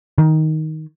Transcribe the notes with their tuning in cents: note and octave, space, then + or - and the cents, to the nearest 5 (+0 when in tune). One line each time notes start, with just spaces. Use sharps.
D#3 +10